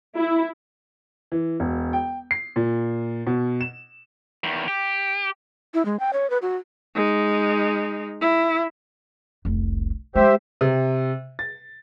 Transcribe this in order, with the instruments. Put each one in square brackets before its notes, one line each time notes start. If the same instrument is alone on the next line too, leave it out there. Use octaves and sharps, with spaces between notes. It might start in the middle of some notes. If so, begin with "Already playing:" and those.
[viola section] E4
[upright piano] E3
E1
G5
C7
A#2
B2
E7
[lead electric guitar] E2 D#3
G4
[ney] E4
G#3
G5
C#5
B4
F#4
[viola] G#3 D#4
E4
[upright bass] F1 C2
[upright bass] G#3 A3 [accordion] G4 C5 E5
[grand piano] C3
A6